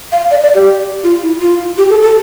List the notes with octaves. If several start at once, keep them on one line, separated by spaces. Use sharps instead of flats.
F5
D5
D5
G4
F4
E4
F4
G4
A4
A4